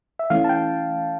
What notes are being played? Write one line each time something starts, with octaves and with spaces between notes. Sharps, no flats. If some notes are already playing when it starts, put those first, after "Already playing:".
E5
E3 A3 C#4 F5
A5
G5